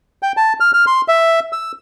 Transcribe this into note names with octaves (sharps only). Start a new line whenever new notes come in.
G5
A5
F6
F6
C6
E5
E6